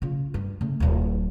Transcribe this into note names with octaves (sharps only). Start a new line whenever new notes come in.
C#3 F4
G2
C#3 A3
D1 E4